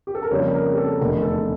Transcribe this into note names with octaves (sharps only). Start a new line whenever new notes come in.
G4
A4
A#4
F2 C#3 G3 A#3 C#5
A#4
G4
A4
F1 E2 D3 A3 A#4
A4